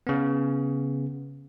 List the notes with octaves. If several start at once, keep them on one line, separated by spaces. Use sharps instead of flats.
C#3 B3